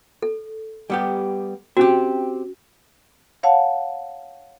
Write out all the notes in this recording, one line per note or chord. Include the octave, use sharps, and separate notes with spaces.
A4
G3 B3 G4
C4 C#4 F#4 G4
C#5 F5 F#5 A5